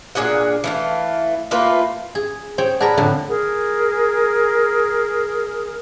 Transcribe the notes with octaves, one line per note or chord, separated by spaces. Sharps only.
A#2 D4 G#4 F#5
E3 A3 F5
A3 A#3 F4 B4
G#4
G#4 C5 C#5 G5
G#4 A#4 B4 D5 F#5 A5
F2 A2 D3
G#4 A#4